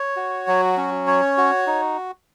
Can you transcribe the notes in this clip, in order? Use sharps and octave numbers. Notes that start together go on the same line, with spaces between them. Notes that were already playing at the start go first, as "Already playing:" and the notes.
Already playing: C#5
F#4
F#3
C#4
C#5
F#4
D#4